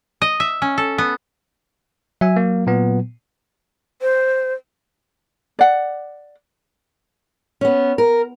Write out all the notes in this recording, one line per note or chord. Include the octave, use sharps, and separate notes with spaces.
D#5
E5
C#4
A4
B3
F#3 E5 G#5
A#3
A#2 B3
C5
D5 F#5
B3 C#4
A#4